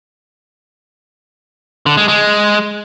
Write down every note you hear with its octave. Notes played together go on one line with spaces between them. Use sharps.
D3
G#3
G#3